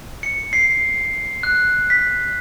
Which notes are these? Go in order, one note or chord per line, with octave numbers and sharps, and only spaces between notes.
C#7
C7
F#6
B6